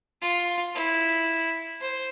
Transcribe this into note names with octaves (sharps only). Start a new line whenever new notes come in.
F4
E4
C5